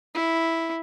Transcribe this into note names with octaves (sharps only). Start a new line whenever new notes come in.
E4